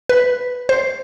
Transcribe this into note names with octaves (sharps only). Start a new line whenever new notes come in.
B4
C5